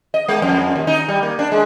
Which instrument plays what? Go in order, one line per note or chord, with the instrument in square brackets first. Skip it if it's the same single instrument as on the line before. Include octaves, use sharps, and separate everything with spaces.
[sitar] D#5
G#3
F2
D#2
D#4
G3
A#3
D4
G#3